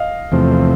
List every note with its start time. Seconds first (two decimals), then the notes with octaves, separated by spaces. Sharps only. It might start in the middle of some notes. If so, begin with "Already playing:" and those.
Already playing: D#5 F5
0.32 E2 C3 F3 A3 C4